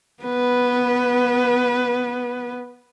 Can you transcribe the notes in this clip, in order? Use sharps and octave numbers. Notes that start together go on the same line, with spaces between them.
B3 B4